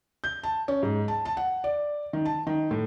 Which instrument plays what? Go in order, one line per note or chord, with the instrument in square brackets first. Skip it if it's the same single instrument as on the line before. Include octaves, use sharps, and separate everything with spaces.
[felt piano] G6
A5
C#4
G#2
A5
A5
F#5
D5
D#3
A5
D#3
A2